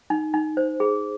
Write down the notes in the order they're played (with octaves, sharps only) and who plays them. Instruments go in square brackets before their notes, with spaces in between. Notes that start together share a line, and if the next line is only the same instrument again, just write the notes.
[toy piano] D#4
D#4
C5
G#4